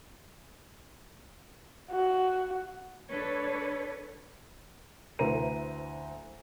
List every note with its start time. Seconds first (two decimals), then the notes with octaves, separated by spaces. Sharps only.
1.91 F#4
3.10 D4 A4 B4 C#5
5.19 D2 E4 B4 C5 A#5 D#7